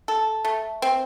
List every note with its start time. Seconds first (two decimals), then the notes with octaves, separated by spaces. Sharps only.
0.08 A4
0.45 A3
0.82 C4